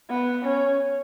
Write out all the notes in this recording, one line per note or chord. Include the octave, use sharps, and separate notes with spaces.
B3
C#4